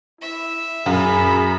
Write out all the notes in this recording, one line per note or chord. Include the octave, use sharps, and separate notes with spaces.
E4 E5
F#2 G#4 B5